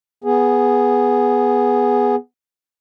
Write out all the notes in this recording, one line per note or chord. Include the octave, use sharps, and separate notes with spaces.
B3 G#4